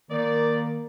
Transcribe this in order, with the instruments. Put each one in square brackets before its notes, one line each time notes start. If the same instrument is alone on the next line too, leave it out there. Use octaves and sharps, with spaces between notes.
[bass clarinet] D#3 [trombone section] A#3 [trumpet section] D5